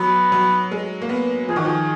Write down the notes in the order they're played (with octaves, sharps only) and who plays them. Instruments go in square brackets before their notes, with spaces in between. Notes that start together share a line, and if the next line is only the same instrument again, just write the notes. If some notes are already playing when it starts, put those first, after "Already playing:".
Already playing: [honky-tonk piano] F#3 [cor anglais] B3
[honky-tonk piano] F#3
G#3
A#3
B3
[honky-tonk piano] F3 [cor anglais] G#4
[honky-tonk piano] D#3 [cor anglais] F#4
[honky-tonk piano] F3 [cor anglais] G#4